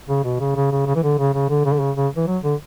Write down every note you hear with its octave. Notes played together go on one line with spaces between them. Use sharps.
C#3
B2
C#3
C#3
C#3
C#3
E3
D3
C#3
C#3
D3
C#3
D3
C#3
C#3
E3
F#3
D3